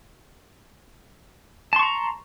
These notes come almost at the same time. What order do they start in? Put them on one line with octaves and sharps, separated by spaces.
A5 C6 C#6 A#5